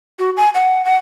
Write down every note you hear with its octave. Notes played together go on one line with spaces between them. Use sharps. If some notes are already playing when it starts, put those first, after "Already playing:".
F#4
G#5
F#5
F#5